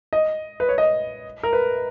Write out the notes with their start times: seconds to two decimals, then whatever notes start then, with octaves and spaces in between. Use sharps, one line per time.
0.13 D#5
0.60 B4
0.69 C#5
0.78 D#5
1.43 A#4
1.53 B4